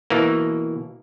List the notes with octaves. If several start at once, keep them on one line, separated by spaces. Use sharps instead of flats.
B2 E3 A#3